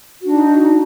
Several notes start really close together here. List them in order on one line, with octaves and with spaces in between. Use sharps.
F#4 D4 D#4